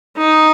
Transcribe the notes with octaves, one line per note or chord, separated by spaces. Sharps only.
D#4